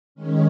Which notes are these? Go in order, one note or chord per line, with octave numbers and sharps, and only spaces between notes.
D#3 G#3 C#4